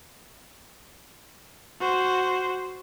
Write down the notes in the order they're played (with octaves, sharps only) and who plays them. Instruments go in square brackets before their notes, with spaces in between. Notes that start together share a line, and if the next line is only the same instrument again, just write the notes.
[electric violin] F#4 C5